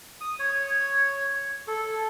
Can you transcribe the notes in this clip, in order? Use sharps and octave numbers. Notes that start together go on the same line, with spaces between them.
D#6
C#5
A4